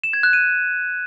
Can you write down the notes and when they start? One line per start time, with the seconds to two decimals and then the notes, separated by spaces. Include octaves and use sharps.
0.04 E7
0.13 G#6
0.23 F#6
0.33 D#7